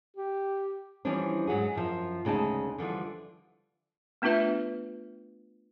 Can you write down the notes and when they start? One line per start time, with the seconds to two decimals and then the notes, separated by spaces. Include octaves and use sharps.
0.17 G4
1.05 E3 F3 G3 C#4 D4
1.47 G#2 F#3 F#4 G#4
1.75 F#2 F3
2.25 D2 C#3 G#3 D#4 A5
2.78 D3 E3 F3 G3
4.22 A3 B3 D4 F4 B4 E5